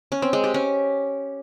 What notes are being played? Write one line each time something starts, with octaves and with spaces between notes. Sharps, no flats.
C#4
C4
G#3
G4
C#4